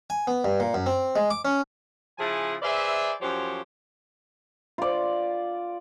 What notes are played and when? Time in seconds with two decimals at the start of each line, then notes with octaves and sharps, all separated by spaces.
0.10 G#5
0.27 B3
0.44 G2
0.60 A#2
0.74 F#2
0.86 C4
1.16 G#3
1.30 D6
1.45 C#4
2.19 C#3 F3 E4 G#4 G#5 A5
2.62 G#4 B4 C5 D5 E5
3.21 F#2 F3 G4 C5 C#5
4.78 F4 D5